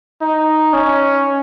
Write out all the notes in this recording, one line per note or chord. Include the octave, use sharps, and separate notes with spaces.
D#4
C#4